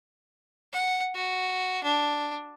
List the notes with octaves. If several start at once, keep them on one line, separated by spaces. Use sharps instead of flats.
F#5
F#4
D4